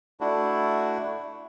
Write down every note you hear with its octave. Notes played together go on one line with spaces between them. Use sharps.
A3 D4 E4 F#4